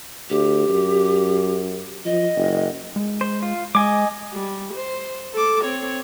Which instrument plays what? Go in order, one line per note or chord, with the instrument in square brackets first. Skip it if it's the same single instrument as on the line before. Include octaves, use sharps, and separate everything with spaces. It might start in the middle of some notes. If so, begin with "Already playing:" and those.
[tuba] D2 [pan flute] G4
[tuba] F#2
[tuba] F3 [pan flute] D#5
[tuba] F#1
[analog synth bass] G#3
[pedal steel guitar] C5
F4
[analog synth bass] G#3 [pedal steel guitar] D#5 G#5 D6
[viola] G3
C5
A4 D6
C4 C#5